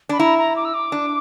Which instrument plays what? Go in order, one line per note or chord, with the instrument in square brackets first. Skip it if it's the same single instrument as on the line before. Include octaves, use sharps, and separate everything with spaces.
[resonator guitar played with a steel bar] D4 [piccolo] B5
[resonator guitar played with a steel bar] E4 [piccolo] A#5
[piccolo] A#5
D6
E6
D6
[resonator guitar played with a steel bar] D4